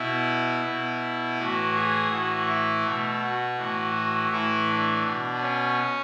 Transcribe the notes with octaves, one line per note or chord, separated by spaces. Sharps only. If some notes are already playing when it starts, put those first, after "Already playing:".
Already playing: B2 E4
B2
A2 E3 F#4
G#4
A2 E3 F#4
E4
B2 A3
F#4
A2 E3
F#4
A2 E3 E4
D4
B2
C#4